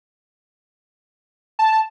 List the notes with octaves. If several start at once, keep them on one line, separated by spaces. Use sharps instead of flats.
A5